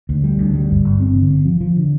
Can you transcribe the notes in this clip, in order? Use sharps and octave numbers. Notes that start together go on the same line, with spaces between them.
D2
G3
D2
G3
G1
G1
C4
D3
C4
F3
F3
D3